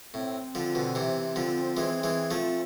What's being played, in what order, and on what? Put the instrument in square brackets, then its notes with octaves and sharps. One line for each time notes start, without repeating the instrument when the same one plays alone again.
[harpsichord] A2 [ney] C4
[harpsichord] D3 F3
B2 D3
C3 E3
D3 F3
E3 G#3
E3 G#3
F3 A3